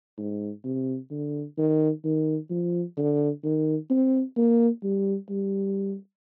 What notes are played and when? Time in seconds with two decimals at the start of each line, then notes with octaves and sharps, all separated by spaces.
0.18 G#2
0.64 C3
1.11 D3
1.58 D#3
2.05 D#3
2.50 F3
2.97 D3
3.44 D#3
3.90 C4
4.36 A#3
4.84 G3
5.30 G3